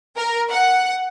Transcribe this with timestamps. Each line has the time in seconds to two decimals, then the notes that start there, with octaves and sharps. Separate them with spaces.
0.17 A#4
0.51 F#5